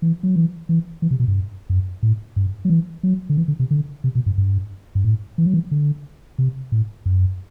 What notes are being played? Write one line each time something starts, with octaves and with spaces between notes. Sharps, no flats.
E3
F#3
E3
E3
E3
C3
B2
G2
F#2
A2
G2
F#3
E3
F#3
D3
E3
D3
C3
D3
C3
B2
G2
G2
G2
A2
E3
F#3
E3
D3
C3
A2
F#2